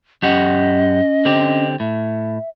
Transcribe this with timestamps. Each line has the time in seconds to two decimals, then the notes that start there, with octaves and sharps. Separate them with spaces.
0.23 F#2 C#4 G4 D#5 F#5
1.25 D3 C4 G4
1.80 A2 E5